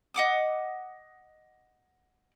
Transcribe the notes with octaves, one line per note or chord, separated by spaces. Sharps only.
D#5 F#5 D6 D#6